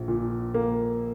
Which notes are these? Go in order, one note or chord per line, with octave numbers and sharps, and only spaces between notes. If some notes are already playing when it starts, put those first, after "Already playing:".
Already playing: A#1
A#2
A#3